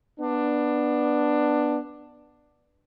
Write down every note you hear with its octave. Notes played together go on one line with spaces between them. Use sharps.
B3 D4